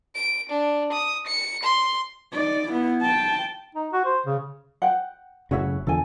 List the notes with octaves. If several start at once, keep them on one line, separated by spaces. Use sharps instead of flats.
D7
D4
D#6
C#7
C6
D#4 D5
B3 E4
G5 A5
D#4
F#4
C5
C#3
F#5 G5
F#1 A2 C#3 F#4 C#5 E5
E2 D3 F3 A4 G#5